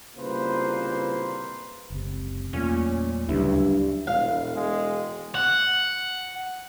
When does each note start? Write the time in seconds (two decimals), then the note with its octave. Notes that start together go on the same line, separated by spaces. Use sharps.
0.17 C2 A#2 C#3 A#3 B4 C5
1.90 F#1 C#2 C3
2.53 E2 A#2 F#3 A3 C#4
3.29 D2 G2 C#3 F#3 E4
4.07 E1 F5
4.57 G#3
5.35 F#5